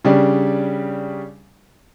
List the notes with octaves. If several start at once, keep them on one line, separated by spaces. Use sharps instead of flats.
C#3 G3 D4